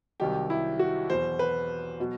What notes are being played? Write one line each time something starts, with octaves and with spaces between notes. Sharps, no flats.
C2 C3 D#3 F#3 G4
E4
F#4
E2 B2 F#3 C5
B4
B2 F#3